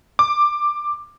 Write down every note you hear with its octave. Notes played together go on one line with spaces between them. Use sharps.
D6